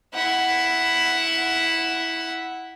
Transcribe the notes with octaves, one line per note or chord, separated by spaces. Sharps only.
E4 F#5